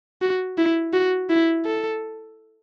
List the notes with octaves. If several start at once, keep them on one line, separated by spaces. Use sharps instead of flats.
F#4
E4
F#4
E4
A4